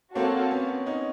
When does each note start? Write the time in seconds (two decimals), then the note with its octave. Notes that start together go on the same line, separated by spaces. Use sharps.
0.15 A#3 C4 F#4 A4 C#5 F5
0.51 B3 C#4
0.86 C#4 D#4